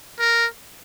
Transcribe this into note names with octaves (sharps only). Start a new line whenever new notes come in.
A#4